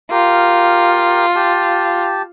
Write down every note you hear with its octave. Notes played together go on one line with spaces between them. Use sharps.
F4 G4 A#4
G4 A5